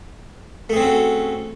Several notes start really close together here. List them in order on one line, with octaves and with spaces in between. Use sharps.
A3 G#4 C4 C#4 F#4